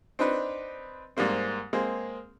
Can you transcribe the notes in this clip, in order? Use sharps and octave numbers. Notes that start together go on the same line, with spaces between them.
C4 D4 D#4 B4
G#2 G3 A#3 C4
G#3 A#3 C4 G#4